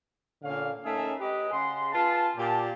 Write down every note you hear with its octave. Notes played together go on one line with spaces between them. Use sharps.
A#2 D3 C#4 F5
A3 C#4 D#4 G#4 A#4 E5
G4 B4 D#5
C#3 G#4 F#5 C6
F4 G#4 B4 A5
A#2 G4 A5